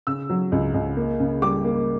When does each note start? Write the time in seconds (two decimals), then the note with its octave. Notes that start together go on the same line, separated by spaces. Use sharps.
0.07 C#3 E6
0.29 F#3
0.52 C#2
0.74 C#2
0.97 A#3
1.20 C#3
1.42 G3 D6
1.64 A#3